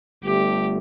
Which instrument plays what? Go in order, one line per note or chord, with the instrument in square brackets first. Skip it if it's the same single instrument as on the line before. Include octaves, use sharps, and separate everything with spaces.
[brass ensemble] G1 G2 D3 A3 [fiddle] G4